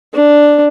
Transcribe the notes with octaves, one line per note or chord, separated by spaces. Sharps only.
D4